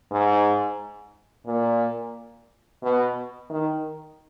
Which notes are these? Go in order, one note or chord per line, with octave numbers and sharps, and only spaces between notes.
G#2
A#2
B2
D#3